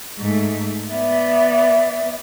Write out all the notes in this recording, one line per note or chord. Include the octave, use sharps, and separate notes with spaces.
G#2 A3
B3 D5 E5